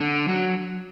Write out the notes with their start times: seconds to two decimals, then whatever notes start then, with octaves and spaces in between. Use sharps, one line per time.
0.01 D3
0.28 F#3